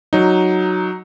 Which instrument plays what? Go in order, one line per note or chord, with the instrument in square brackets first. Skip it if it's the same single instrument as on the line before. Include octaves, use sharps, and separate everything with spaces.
[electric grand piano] F#3 D#4